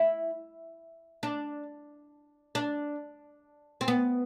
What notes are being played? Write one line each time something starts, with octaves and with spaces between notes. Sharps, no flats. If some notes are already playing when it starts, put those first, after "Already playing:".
Already playing: E4
D4
D4
C4
B3